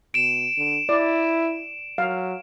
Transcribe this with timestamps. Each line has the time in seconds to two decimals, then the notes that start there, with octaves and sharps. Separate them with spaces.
0.14 B2 D7 E7
0.57 D3
0.89 E4 D5
1.98 F#3 F5